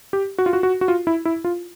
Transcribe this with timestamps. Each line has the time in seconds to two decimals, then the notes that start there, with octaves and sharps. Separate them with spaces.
0.13 G4
0.38 F#4
0.46 F4
0.53 F#4
0.63 F#4
0.81 F#4
0.88 F4
1.07 E4
1.25 E4
1.44 F4